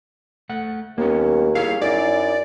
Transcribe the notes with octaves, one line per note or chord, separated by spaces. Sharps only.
A3 F#5
D#2 A#3 B3 C#4
E4 G#4 C#5 F5
F#2 D#4 E4 D5